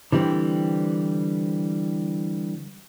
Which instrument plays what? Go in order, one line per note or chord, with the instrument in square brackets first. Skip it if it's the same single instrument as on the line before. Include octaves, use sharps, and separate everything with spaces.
[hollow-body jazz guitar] D3 E3 G3 C4